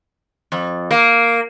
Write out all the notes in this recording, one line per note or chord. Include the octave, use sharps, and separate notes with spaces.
F2
A#3